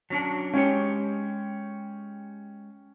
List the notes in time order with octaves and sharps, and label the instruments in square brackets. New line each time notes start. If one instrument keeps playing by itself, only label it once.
[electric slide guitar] F#3 C#4 D4
[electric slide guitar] G#3 G4 C#5 [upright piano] C#4